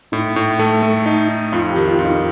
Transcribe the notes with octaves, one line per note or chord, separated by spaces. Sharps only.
A2 D#4
A2
A3
A3
D#4
D#4
F2 F4
G4
D#3
F4
F2
D#4